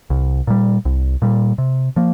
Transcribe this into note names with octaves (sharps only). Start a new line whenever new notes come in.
C2
A#2 G3
C2
A#2 G3
C3
F3 A#3